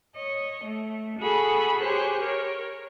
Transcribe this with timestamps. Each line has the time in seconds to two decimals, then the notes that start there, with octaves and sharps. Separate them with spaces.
0.15 C#5 D#5
0.62 A3
1.20 F#4 G#4 A4 B5 D#6
1.81 G4 G#4 C5 C#5 F#6
2.21 A#4 C#5